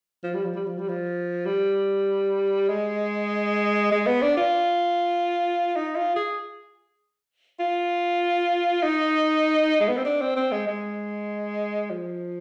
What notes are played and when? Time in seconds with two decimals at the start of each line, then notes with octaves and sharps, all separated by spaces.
0.24 F3
0.35 G3
0.45 F3
0.55 G3
0.66 F3
0.79 G3
0.89 F3
1.46 G3
2.69 G#3
3.92 G#3
4.07 B3
4.22 D4
4.37 F4
5.76 D#4
5.96 F4
6.16 G#4
7.60 F4
8.83 D#4
9.81 G#3
9.89 B3
9.97 C4
10.05 D4
10.21 C4
10.36 C4
10.52 G#3
10.67 G#3
11.90 F3